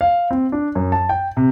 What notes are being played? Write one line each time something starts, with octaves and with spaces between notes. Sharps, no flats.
F5
C4
D4
F#2
A5
G5
C3